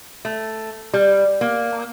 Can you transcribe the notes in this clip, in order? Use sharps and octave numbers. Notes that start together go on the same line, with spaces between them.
A3
G3
A#3